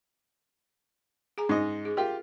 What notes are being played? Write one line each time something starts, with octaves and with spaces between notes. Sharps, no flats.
G#4 G#5 A#5
G#2 C#4 D#5
G#4
F4 G4 A#4 E5